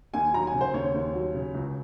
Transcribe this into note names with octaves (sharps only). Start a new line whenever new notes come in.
D#2 G#5
F#3 A#5
G#5
C#3
C5
D#2 C#5
D#2
F#3
C#3
C#2